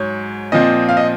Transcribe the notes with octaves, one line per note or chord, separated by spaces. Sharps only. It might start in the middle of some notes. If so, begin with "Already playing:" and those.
Already playing: G#2 F#3 C#5
A#2 F3 C4 D#5
F5
D#5